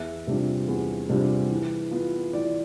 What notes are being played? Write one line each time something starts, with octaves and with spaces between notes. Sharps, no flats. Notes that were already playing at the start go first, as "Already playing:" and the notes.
Already playing: E2 E5
C3 G3 D4 F4
E2
C3 G3 D4 F4
E3
B3 F4
E3 D5